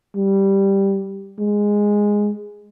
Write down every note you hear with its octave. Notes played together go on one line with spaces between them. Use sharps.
G3
G#3